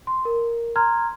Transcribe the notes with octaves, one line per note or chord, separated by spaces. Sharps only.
C6
A#4
A#5 C6 F6 G#6